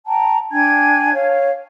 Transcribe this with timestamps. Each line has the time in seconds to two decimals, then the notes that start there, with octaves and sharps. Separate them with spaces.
0.06 G5 A5 A#5
0.51 D4 G5 G#5 G#6
1.13 C#5 F5